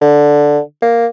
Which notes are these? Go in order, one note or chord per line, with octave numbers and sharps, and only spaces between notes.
D3
A#3